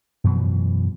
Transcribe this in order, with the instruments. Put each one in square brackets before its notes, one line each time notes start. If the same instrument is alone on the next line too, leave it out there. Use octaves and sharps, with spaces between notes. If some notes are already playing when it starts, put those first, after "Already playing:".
[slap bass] F#2 B2 E3 F3